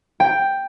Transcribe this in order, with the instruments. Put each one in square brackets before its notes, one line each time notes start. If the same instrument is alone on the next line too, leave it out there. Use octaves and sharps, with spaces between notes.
[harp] G5